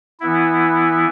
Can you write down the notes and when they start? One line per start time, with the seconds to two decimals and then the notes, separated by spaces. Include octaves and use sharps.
0.20 E3 B3 E4